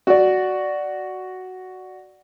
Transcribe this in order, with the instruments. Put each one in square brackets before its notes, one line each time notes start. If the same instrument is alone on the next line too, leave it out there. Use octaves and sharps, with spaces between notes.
[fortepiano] F#4 D5